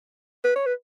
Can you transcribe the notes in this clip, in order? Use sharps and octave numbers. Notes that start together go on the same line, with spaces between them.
B4
C#5
B4